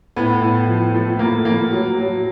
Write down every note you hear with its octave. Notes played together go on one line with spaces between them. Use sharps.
A2 B3
A2
F3
F3 A3
A2 A#3
F3 A#3
F#3
F#3